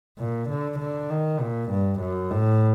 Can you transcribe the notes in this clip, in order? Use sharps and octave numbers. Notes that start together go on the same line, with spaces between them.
A#2
D3
D3
D#3
A#2
G2
F#2
A2